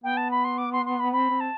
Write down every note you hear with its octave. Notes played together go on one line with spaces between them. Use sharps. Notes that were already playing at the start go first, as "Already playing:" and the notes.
B3 G5
A5
B5
C6
D6
C6
C6
B5
C4 B5
C4
A5